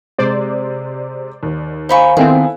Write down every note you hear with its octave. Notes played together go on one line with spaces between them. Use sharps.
C3 G#3 C5 D5
D#2
D#4 C5 F5 G#5 B5 C#6
D#3 B3 C4 E4 G#4 A4